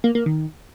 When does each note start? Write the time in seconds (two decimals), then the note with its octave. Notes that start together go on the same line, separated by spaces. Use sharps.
0.04 A#3
0.15 A#3
0.26 D#3